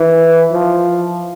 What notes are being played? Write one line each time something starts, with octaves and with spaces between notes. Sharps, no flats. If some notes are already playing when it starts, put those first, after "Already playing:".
Already playing: E3
F3